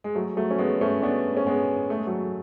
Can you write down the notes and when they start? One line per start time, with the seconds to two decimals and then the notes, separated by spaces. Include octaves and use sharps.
0.04 G#3
0.15 F#3 A3
0.37 F#3 A3
0.51 C#4
0.58 G#3 B3
0.81 A3 C#4
1.02 B3 D4
1.37 C#4
1.47 G#3 B3
1.90 A3
1.99 G#3
2.07 F#3 A3